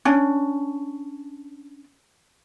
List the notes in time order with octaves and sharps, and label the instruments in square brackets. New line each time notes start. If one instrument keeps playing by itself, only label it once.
[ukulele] C#4 D4